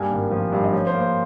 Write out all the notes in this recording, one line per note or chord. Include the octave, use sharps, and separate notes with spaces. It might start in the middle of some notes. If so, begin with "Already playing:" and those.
Already playing: G2 A#3 G#5
G#1
F3
G2 F5
D#5
F3 C#5
C5
A#3
C5